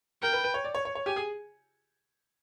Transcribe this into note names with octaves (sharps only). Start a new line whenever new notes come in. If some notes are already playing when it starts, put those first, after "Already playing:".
A#4 G5
B4
B4
C#5
D5
C#5
C#5
C#5
G4 G#5
G#4